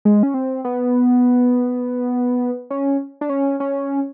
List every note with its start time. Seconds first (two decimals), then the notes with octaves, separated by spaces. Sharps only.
0.05 G#3
0.23 C#4
0.34 C4
0.65 B3
2.70 C#4
3.21 D4
3.29 C#4
3.60 C#4